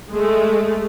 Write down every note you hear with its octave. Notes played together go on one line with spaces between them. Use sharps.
G#3 A3